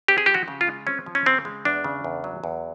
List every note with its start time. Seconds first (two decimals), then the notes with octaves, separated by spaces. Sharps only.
0.08 C4 G4
0.18 G#4
0.26 F3 G4
0.34 F#4
0.48 C#3
0.61 F4
0.67 G#3
0.87 C4 C#4
1.06 F3
1.15 C#4
1.26 C#3 C4
1.45 G#3
1.65 E2 D4
1.84 C#3
2.04 E2
2.24 F#3
2.44 E2